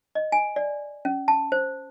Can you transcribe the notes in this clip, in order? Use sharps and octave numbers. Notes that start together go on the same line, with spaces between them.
D#5
G#5
D5
C#4
A5
C5